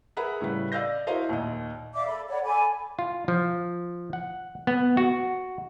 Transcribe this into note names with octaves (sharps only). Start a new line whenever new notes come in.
G#4 A#4 B4 E5 F#5 B5
A2 C#3 G3 B4
D5 D#5 F5 E6 G6 A#6
E4 F#4 A#4 C5 D#5 F5
D#2 A#2 D#5
D5 E5 F5 D6
A4 B5
C#5 D5 F#5 B5
A4 G#5 B5 D6
F4
F3
F#5
B3
F#4